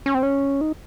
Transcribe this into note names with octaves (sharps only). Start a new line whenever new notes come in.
C#4
C4
C#4
D#4